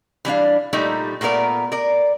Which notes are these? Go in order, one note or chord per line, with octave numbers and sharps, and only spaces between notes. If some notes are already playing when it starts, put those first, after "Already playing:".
E3 G3 D4 F5
A#2 G3 A3 D#4 G4
A#2 A3 B3 A#4 D5
A#4 D5